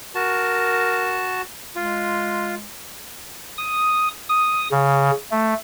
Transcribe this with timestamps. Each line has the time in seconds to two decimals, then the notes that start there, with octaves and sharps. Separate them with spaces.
0.15 F#4 A#4 A5
1.75 G#3 F4
3.58 D#6
4.29 D#6
4.72 C#3
5.31 A3